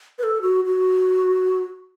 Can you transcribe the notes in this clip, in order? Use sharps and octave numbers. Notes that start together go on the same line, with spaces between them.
B4
A4
F#4
F#4